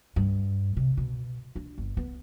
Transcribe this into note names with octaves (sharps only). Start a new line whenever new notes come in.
G2
C3
B2
D4
G1
B3